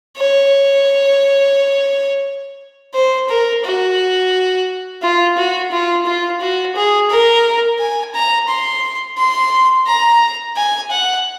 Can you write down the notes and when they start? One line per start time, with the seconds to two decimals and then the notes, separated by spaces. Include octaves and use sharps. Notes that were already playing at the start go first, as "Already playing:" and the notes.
0.17 C#5
2.94 C5
3.29 A#4
3.64 F#4
5.02 F4
5.37 F#4
5.72 F4
6.06 F4
6.41 F#4
6.75 G#4
7.10 A#4
7.80 G#5
8.14 A#5
8.48 C6
9.18 C6
9.87 A#5
10.57 G#5
10.91 F#5